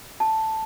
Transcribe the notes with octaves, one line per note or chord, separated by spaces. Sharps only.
A5